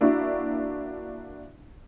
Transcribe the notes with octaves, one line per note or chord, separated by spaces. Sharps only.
A#3 D4 E4 F#4